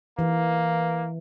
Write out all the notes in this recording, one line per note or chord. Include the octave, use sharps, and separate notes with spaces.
E3 A#3